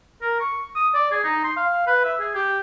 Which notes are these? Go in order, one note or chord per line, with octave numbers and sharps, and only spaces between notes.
A#4
C#6
D#6
D5
G#4
D#4
C6
F5
B4
E5
G#4
G4